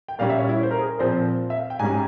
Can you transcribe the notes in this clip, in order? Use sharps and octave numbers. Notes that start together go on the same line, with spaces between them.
G5
A#2 G3 C#4 F5
E5
C#5
E4
C5
A#4
G#4
A#2 F3 C4 C5
E5
F5
G5
G#2 G3 C#4 G#5